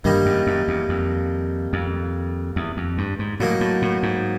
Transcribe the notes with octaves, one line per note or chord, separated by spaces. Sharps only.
G2 D#3 G3 A#3 D#4
F#2
F#2
E2
F2
F2
E2
F2
G2
G#2
A2 F#3 A#3 D#4
A2
A2
G#2